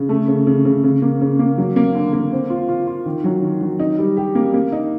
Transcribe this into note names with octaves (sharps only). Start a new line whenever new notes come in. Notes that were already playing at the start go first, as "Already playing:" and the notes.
Already playing: C#3
A3
C#3
C#3
C#3
C#3
A#3
C#3
A#3
F#3
A#3
D3
A#3
C4
F4
F4
F4
D#3
F#3
D#3
F#3
D#4
G3
G4
A#3
A#3
D#4